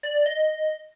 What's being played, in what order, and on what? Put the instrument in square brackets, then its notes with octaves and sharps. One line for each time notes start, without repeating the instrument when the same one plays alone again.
[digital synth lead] D5
D#5